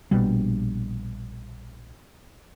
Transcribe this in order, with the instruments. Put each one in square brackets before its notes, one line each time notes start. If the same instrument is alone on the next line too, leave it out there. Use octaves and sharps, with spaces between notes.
[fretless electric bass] A#1 B2 G3